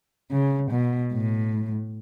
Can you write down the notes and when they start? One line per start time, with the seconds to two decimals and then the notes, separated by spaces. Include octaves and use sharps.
0.31 C#3
0.71 B2
1.13 A2